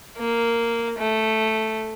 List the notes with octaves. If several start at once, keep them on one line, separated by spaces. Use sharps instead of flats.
A#3
A3